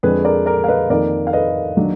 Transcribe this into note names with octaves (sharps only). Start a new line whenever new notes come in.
F2 D3 G#3 D4 G#4 B4
A#4 D5
A#4 D5
F5
B4 D#5
F2 D#3 A#3 A#4 D5
F5
B4 D#5
D#3 F#3 A#3 D4